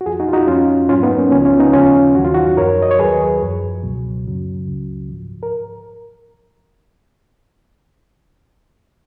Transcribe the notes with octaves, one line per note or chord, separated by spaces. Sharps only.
F#4
F2 F3 F4 G#4
D#4 F#4
F4
D#4 F#4
F2 F3 C#4 F4
G#2 F#3 C#4 F4
B3 D#4
A#3 C#4
C#2 C#3 F3 C#4 F4
C#4 F4
B3 D#4
D#2 C#3 F3 C#4 F4
D#2 D#3 F#3 F#4
F4
D#4 F#4
F#2 F3 A#4 C#5
D#5
C#5
D#2 D#3 F#3 G#4 B4
F#2 F3
C#2 B2 F#3
F#2 C#3 F#3
C#2 C#3 F#3
G#2 F3
A#4